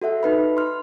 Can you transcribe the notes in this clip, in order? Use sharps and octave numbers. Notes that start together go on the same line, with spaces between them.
F#4 A4 E5 F#5
D#4 B4 B5
C6 F6